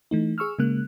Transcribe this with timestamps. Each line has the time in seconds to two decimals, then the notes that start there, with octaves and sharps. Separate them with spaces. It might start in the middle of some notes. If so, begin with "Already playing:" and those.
0.11 E3 A3 D#4
0.38 G#4 C#6 E6 F6
0.59 C#3 G#3 A#3 F#6